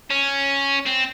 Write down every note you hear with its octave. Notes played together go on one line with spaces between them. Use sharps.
C#4
C4